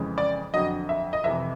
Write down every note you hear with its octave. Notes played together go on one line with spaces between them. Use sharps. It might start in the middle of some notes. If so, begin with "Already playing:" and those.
Already playing: F2 C#3 E3 G#3
D5
F2 D3 F#3 D#5
E5
D#5
F2 C3 E3 E5